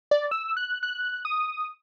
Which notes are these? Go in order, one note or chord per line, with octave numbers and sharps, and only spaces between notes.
D5
E6
F#6
F#6
D#6